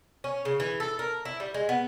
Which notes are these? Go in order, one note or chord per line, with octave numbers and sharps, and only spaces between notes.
C#4
C#3
E3
A4
A#4
E4
G3
G#3
B3